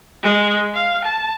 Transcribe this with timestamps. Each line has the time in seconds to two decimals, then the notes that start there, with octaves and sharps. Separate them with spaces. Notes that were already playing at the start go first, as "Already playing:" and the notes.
0.23 G#3
0.74 F5
1.04 A5